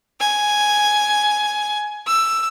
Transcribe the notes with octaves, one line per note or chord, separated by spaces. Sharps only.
G#5
E6